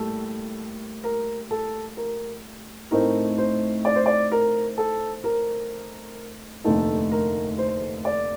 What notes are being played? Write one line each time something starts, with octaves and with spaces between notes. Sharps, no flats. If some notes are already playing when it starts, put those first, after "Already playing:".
Already playing: A2 G3 A#3 A4
A#4
A4
A#4
A2 A3 C4 D#4 A#4
C5
D5
C5
D5
A#4
A4
A#4
F1 D#2 D3 A3 D#4 A4
A#4
C5
D5